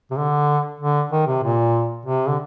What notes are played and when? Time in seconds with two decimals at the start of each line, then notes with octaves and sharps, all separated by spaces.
0.11 C3
0.18 D3
0.80 D3
1.12 D#3
1.27 C3
1.43 A#2
2.06 C3
2.29 D3